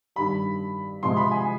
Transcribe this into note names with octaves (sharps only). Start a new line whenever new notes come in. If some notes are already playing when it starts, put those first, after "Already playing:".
G2 D#3 G3 B5
C3 F3 G#3 C6
B5
G#5